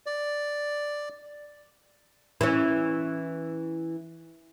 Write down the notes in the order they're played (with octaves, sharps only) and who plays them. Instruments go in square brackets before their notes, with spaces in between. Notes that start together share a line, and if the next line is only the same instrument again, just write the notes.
[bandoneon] D5
[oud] E3 C#4